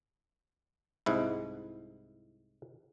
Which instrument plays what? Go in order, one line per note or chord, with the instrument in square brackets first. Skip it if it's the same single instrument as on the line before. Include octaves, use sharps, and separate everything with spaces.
[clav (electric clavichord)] C2 G#2 E4